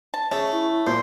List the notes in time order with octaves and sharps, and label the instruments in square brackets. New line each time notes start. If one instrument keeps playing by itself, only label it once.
[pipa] A5
[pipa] A3 [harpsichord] C#4 G#4
[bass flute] E4
[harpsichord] A#2 A#3 [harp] C5